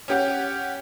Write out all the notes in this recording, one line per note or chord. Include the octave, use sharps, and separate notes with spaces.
C#4 G4 F#5